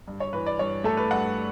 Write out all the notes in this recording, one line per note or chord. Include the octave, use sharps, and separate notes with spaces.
G2
C#5
E3 B4
D5
G2 C#5
A3 A4
B4
G2 F#5